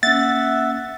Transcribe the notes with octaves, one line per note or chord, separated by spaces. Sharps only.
A#3 C#4 E5 F#5 A6